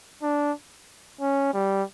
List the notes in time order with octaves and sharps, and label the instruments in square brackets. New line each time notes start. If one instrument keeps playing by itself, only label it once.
[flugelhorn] D4
C#4
G3